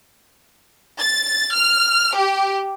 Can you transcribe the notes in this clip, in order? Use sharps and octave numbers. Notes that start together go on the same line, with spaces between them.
A6
F6
G4